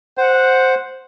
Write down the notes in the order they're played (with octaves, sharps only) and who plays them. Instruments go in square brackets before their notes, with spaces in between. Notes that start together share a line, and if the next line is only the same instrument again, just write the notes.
[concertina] C5 [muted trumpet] F#5